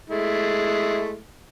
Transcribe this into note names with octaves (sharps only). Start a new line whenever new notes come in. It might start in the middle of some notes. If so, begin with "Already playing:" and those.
G#3 A3 E4